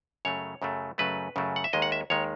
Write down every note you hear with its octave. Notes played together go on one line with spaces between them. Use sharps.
F#2 C#3 F#3 A3 C#5
F#2 C#3 F#3 A3
F#2 C#3 F#3 A3 B4
F#2 C#3 F#3 A3
F#5
E5
D#2 D#3 G#3 D#5
F#5
E5
D#2 D#3 G#3 C#5